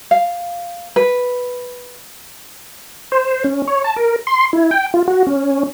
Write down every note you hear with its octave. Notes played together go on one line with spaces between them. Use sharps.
F5
B4
C5
C#4
C#5
A5
A#4
C6
E4
G5
F4
F#4
C#4